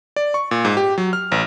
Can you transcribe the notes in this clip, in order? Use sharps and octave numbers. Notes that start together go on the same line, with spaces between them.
D5
C#6
A#2
G#2
G4
F#3
F6
A1